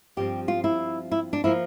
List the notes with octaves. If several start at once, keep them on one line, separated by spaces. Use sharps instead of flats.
G2 F3 C4 G4
F4
E4
E4
D4
F3 A#3 E4